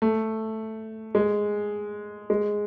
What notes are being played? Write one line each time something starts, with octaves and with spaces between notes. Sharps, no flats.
A3
G#3
G#3